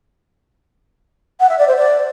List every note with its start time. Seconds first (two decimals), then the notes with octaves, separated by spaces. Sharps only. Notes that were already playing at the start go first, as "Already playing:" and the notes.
1.40 F#5
1.49 E5
1.59 D5
1.68 C5
1.77 D5